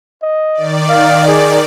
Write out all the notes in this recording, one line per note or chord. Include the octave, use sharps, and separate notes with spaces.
D#5
D#3 D5
F5
G#4